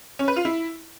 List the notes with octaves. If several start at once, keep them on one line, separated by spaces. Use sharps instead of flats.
C#4
B4
F4
E4